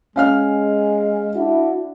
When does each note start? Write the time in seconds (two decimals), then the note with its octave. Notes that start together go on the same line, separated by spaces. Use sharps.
0.16 G#3 C#4 F5 F6
1.36 D4 E4 F#4